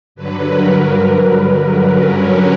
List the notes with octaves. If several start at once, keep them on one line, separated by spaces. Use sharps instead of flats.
G2 D3 F#3 B4
A#4
A#4
C#4